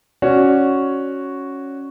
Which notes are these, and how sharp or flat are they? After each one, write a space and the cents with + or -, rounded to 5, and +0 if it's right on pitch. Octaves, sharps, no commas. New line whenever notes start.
C#4 +0 F#4 +0 D5 +0